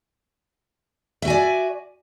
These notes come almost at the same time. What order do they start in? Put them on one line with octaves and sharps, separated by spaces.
E5 F#4 G#5 D5